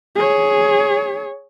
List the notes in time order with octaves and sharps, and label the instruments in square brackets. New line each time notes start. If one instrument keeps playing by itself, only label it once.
[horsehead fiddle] G#4 C#5